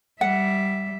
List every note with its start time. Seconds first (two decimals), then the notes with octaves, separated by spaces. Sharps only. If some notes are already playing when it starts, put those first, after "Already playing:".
0.21 G3 E5 F#5